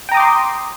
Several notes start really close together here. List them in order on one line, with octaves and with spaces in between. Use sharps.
G5 A#5 D#6 D6 C6